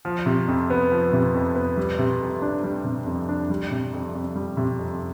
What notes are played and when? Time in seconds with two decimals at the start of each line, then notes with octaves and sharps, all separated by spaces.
0.05 F3
0.26 C3
0.48 F2
0.70 B3
0.92 F3
1.13 C3
1.34 F2
1.55 B3
1.77 G3
1.99 C3
2.21 F2
2.42 D4
2.64 G3
2.84 C3
3.06 F2
3.29 D4
3.50 G3
3.71 C3
3.93 F2
4.15 F2
4.36 G3
4.57 C3
4.79 F2